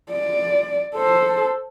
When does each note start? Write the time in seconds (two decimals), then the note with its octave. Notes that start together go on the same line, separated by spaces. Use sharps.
0.11 D5
0.95 A4 C5